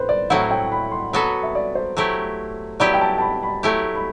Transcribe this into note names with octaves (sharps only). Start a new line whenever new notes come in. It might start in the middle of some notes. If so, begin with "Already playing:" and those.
Already playing: A2 B4 C5
D5
A2 F#3 C4 E4 F#5
G5
B5
C6
F#3 B3 F#4 A4 B5
E5
D5
C5
F#3 A3 E4 G4
F#3 B3 E4 G4 D5
G5
A5
A5
B5
B5
F#3 A3 E4 G4
B5